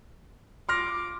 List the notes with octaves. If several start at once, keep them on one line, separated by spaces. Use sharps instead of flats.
F4 C6 D6 F6 A#6